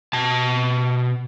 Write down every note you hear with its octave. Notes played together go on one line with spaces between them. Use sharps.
B2 A5